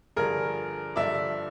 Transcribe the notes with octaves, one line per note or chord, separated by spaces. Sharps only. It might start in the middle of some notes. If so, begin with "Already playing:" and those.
G2 D3 F3 G#4 A#4
G2 D3 F3 D5 E5